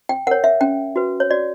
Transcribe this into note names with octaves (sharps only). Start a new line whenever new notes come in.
G5
A#4 C#5 F#5
E5
C#4 G5
F#4 B4
C#5
F#4 D5